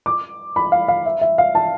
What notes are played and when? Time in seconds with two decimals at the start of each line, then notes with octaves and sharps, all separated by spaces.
0.06 D6
0.56 B5
0.72 F5
0.88 F5
1.06 E5
1.21 E5
1.38 F5
1.55 A5